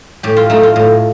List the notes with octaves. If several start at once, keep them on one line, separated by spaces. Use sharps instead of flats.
A2 G4
F4
A3 D#4
F4
A2